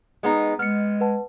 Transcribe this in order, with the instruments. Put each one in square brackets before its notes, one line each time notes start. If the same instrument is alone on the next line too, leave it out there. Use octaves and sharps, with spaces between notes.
[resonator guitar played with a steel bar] G#3 B3 D#4
[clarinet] G#3 [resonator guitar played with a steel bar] B3 [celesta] F6 C#7
[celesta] B4 F#5 A5